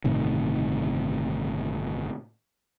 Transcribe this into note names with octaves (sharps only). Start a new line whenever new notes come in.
G1 A2 C3 D#3